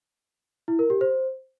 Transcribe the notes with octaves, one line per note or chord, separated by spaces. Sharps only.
E4
A#4
G4
C5